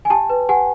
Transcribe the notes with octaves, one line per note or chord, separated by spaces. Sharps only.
G#5
G4 G5 A5
B4
G4 F#5 G#5